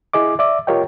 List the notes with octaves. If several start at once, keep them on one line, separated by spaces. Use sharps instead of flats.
E4 G#4 D#5 D6
D5 E5 D6
F4 G4 A#4 C#5 D#5 G5